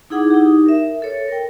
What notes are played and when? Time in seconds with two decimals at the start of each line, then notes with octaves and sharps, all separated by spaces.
0.10 D#4 E4 G#4 F#5 D6 D#6
0.30 D#4 G4
0.66 A#4 E5
1.02 A4 C#5
1.28 A#4 G5